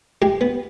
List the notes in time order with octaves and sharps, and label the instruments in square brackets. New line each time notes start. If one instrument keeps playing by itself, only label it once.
[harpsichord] G#3 G4
B3